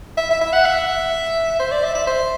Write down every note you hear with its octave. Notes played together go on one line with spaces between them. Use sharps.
E5
E5
E5
F#5
E5
C5
D5
E5
E5
C5